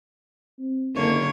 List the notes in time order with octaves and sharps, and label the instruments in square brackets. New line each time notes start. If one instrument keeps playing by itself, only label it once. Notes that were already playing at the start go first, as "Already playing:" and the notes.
[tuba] C4
[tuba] F#1 [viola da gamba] D3 A#3 C#5